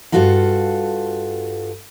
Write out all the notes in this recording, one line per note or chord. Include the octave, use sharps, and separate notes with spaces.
G2 E3 F4 F#4 A4 F5